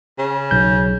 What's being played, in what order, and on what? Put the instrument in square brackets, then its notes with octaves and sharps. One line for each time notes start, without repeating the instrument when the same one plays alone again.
[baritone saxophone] C#3
[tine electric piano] B1 G6